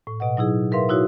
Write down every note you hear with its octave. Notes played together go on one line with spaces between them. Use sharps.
A2
B2 D#5 F#5
F#3 D#4 E4 G#4
G#4 A#4 B4 E5 F5 C6
D#4 E4 F#4 C#5